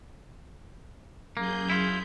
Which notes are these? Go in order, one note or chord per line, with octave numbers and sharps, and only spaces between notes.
F#2 A#3 G#4 G6
E4 F4